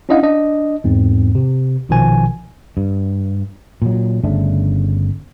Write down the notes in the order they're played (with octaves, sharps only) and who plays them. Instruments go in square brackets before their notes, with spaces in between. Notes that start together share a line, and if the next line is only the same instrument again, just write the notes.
[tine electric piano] C#4 D4 E4 D#5 F5 F#5
D4 D#5
E2 G#2 C4
C3
A#1 B2 D#3 F3 G#5
[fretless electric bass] G2
A#2 F#3
G1 C#3 A3 D4